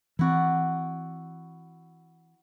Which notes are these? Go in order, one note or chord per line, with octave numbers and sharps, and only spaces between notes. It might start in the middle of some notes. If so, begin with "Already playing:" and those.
E3 C4 E4 F#4 D5